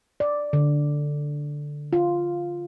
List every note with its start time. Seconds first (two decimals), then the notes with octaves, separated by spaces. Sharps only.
0.20 D5
0.53 D3
1.93 F4